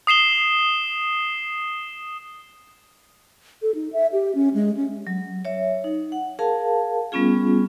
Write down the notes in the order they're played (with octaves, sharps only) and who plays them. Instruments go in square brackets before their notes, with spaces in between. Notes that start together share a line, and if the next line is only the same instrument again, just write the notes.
[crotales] D#6 C7 E7 G7
[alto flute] A4
D#4
E5
G4
C#4
G#3
C#4
[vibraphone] F#3
C#5 E5
D#4
F#5
G#4 A#4 F5 A5
G3 B3 C#4 F4 G#4